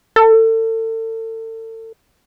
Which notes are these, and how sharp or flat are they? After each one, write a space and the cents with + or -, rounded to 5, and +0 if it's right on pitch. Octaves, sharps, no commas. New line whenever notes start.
A4 +35